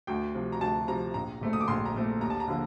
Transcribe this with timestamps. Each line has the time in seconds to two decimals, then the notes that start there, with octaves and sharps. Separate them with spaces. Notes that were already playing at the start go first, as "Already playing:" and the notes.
0.07 D2 G5
0.35 C3 F3
0.52 A#5
0.61 D2 A5
0.88 C3 F3 A#5
1.14 A#1 A#5
1.41 A#2 A3 C4
1.53 D#6
1.61 D6
1.68 A#1 C6
1.85 A#5
1.94 A#2 A3 C4
2.21 D#2 A#5
2.30 A5
2.40 A#5
2.48 D3 F3 A#3